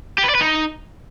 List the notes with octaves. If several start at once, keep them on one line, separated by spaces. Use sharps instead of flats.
G4
B4
D5
B4
D#4